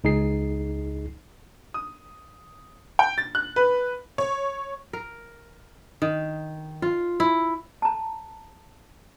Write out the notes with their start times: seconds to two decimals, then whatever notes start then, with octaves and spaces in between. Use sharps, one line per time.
0.04 C#2 D#4 G#4 C7
1.74 D#6
2.99 G5
3.18 A6
3.35 F#6
3.56 B4
4.18 C#5
4.93 A#4
6.02 D#3
6.82 F4
7.20 E4
7.82 A5 A#5